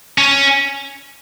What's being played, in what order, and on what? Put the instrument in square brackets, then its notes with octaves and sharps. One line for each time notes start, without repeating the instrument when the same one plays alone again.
[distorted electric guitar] C#4